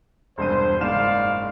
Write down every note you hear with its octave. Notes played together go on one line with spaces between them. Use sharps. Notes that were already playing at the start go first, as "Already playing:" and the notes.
E1 G2 C5 D#7
F#1 G#2 D5 F5 E7